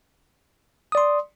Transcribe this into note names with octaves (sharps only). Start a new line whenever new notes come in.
D5 C6 D#6